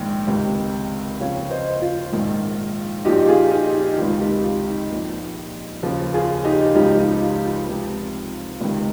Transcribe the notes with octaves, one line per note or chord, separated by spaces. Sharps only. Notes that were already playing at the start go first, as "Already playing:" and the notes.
Already playing: A#1 G#2 D#3 G5
C#2 C3 D#3
D#2 C#3 F3 C#5 F5
C5 D#5
F4
A#1 G#2 D#3
A#1 A#2 F3 D#4 G4
F4 G#4
D#4 G4
D#4
C#2 C3 D#3 F4
D#4 G4
F4
D#4
A#1 A#2 F3
D#2 C#3 F3 F4
F4 G#4
D#4 G4
C#2 C#3 F3 D#4 G4
D#4 G4
F4
F4
C#2 C3 F3
C#2 C3 D#3